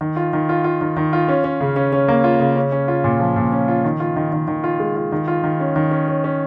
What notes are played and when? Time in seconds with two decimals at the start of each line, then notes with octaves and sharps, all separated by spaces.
0.01 D#3
0.16 F4
0.33 D#3
0.49 F4
0.64 F4
0.81 D#3
0.97 D#3
1.13 F4
1.28 C#4
1.44 C#4
1.61 C#3
1.76 C#4
1.93 C#4
2.08 A#3
2.24 F4
2.40 C#3
2.56 C#4
2.72 C#4
2.88 F4
3.04 A#2
3.20 F3
3.36 A#2
3.52 C#4
3.68 F4
3.84 D#3
4.00 F4
4.16 D#3
4.33 D#3
4.48 D#3
4.64 F4
4.80 G#3
4.96 F4
5.12 D#3
5.28 F4
5.44 D#3
5.60 C#4
5.76 D#3
5.91 C#4
6.08 C#4
6.24 C#4